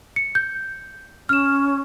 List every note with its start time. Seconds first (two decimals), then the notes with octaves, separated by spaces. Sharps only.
0.16 C#7
0.35 G6
1.29 C#4 F6 E7